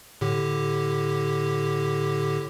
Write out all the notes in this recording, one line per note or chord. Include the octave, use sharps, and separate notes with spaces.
A2 D3 G4